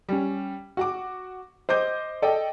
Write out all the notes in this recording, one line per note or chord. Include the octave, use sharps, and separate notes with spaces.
G3 C#4
F#4 F#5 D6
C5 D#5 D6 G6
A4 D5 D#5 G5